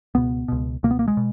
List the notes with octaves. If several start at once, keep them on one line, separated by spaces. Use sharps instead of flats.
C#2 B2 B3
C#2 B2
C#2 B2 A#3
B3
A#3
G#3
B2